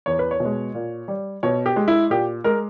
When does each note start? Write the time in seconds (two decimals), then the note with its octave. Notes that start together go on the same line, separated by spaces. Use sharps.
0.06 E2 C#5
0.19 B4
0.31 C#5
0.40 B2
0.45 G#3
0.74 A#2
1.08 G3
1.43 B2 C#5
1.66 G4
1.76 G#3
1.88 E4
2.10 A#2 G4
2.44 G#3 A#4